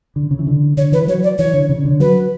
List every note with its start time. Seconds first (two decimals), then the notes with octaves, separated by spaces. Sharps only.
0.16 D3
0.31 C#3
0.39 E3
0.47 D3
0.77 D3 C#5
0.92 E3 B4
1.08 F#3 C#5
1.23 D5
1.38 E3 C#5
1.54 D3
1.69 C#3
1.85 D3
2.00 F#3 B4